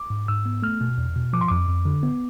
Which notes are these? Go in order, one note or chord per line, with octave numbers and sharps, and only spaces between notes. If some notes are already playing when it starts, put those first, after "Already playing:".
Already playing: D6
G#2
G#2 E6
B3
A3 F6
B2
E2
B2
F3 D6
C6
F2 D6
F2
D3
B3